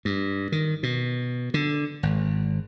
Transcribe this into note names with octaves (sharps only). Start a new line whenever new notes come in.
G2
D#3
B2
D3
G#1